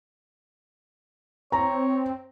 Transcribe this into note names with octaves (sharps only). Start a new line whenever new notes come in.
C4 C#5 A#5